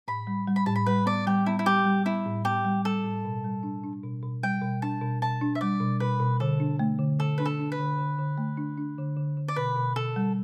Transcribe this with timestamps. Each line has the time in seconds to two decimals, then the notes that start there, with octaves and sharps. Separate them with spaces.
0.08 A2 B5
0.27 G3
0.48 G3
0.56 B5
0.66 A2 A5
0.75 B5
0.86 G3 B4
1.06 B3 D5
1.27 G3 G4
1.46 B3 E4
1.59 E4
1.66 G3 G4
1.85 G3
2.05 B3 E4
2.26 A2
2.45 B3 G4
2.65 G3
2.85 G3 A4
3.04 A2
3.25 B2
3.44 G3
3.63 D4
3.83 D4
4.04 B2
4.23 B2
4.43 G3 G5
4.62 B2
4.82 D4 A5
5.01 B2
5.22 B2 A5
5.41 D4
5.55 E5
5.61 G3 D5
5.81 B2
6.00 B2 B4
6.20 B2
6.40 D3 A4
6.60 D4
6.79 A3
6.99 D3
7.19 D3 A4
7.38 D4 B4
7.46 A4
7.59 D4
7.72 B4
7.79 D3
7.98 D3
8.19 D3
8.38 A3
8.57 D4
8.77 D4
8.98 D3
9.17 D3
9.37 D3
9.48 D5
9.56 B2 B4
9.76 B2
9.96 B2 A4
10.16 G3